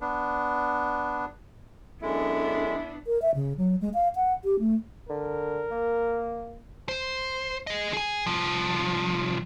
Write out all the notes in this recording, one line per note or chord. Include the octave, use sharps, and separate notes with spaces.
B3 D4
F#2 G#3 B3 D4 E4 A4
A#4
E5
C#3
F#3
G#3
F5
F#5
G4
A3
D3 A#4
A#3
C5
G#4 D#5
G#4 G#5
C2 F3